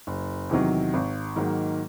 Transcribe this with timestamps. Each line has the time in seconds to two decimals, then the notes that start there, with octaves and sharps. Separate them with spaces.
0.07 F#1
0.49 E2 C3 D#3 F#3
0.93 G#1
1.36 G#2 D#3 F#3 A#3